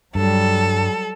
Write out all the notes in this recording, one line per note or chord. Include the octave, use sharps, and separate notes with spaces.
G2 F#3 G3 A4